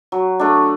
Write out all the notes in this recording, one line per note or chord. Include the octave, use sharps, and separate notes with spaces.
F#3
A3 D4